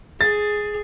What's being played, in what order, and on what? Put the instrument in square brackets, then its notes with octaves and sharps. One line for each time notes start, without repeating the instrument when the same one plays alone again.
[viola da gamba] G#4 [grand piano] A6